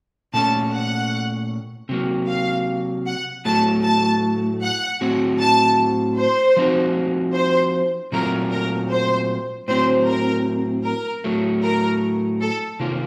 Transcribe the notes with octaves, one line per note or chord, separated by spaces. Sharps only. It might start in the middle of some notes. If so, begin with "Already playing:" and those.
A#2 A3 C#4 A5
F#5
C3 F#3 A#3
F5
F#5
A2 F#3 A3 A5
A5
F#5
A2 F#3 C4 F#4
A5
C5
F3 C4 D#4 F#4
C5
A#2 F#3 A3 C4 F4 A#4
A#4
C5
A2 F#3 C4 C5
A#4
A#4
A2 F#3 A3
A#4
A4
C3 D#3 A#3 F4